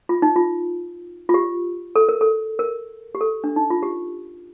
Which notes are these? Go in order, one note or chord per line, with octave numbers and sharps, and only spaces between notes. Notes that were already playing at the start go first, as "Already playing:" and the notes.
F4
D#4
F4
F4
G4
A4
A#4
A4
A#4
G4
A4
D4
D#4
F4
G4